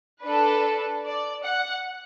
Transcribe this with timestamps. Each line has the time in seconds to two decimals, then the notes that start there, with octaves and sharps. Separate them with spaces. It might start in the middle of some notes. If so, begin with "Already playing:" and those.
0.23 D4 A4 B4
1.05 D5
1.45 F#5